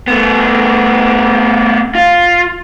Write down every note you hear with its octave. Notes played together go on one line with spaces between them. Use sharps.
A3 B3
F4